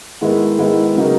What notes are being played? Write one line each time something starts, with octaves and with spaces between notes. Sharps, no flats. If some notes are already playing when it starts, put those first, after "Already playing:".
G#2 D#3 G#3 B3 E4
G#2 D#3 G#3 B3 E4
C#3 F#3 A#3 D#4